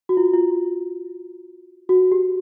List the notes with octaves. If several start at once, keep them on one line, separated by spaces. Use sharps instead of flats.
F#4
F4
F4
F#4
G4